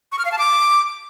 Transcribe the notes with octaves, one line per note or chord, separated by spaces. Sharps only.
C#6
F6
F5
A5
D6